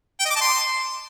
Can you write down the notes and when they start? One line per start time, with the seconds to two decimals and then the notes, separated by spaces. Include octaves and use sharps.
0.20 G5
0.25 D#5
0.30 D6
0.36 A5
0.41 C6